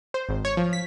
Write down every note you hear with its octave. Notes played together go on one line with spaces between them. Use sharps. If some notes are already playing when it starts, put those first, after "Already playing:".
C5
G#1
C#5
F3
B6